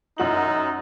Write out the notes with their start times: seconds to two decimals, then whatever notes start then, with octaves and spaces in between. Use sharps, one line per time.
0.18 F#2 D#4 F#4 F#7